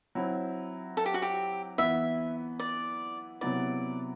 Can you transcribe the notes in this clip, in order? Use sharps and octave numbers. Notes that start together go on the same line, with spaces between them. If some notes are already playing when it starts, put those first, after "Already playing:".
F#3 C4 E4
A4
G4
F#4
G4
E3 B3 E4 E5
D5
C3 F#3 B3 E4 D5